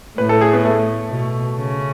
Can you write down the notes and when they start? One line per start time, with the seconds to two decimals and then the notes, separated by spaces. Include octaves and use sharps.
0.18 A2 B4
0.29 A4
0.41 G#4
0.53 B3
0.65 A3
1.10 B2
1.57 C#3